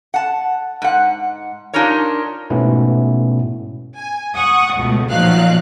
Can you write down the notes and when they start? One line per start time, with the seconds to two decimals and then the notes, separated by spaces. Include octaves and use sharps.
0.14 F#5 A5
0.82 G#2 F#5
1.73 D4 D#4 F4 G4 A#4 C#5
2.50 G#2 B2 A3 B3 C#4 E4
3.96 G#5
4.33 F#5 C#6 D#6
4.75 C#2 B2 A3
5.09 A#2 F3 F#3 D#4 F5 F#6